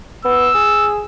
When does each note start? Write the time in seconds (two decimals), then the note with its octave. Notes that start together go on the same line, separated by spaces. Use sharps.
0.25 B3 E6
0.54 G#4